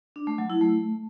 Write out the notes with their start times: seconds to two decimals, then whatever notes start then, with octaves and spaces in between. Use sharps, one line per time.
0.16 D4
0.27 A3
0.38 F#3
0.50 E4
0.61 A3